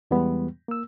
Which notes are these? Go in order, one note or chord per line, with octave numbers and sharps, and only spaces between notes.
E2 E3 G3 G#3 B3
A#3 E6